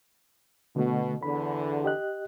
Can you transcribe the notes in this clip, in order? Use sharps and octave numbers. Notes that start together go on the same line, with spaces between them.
B2 D3 A3
E2 D3 B5
G4 D#5 F#6